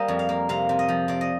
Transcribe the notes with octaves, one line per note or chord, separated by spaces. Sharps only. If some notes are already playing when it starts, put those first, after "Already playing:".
Already playing: G3 A#3 C5 D#5
F2
F5
A#3
C3 F5
C3
D#5
F3
C3 D5
D#5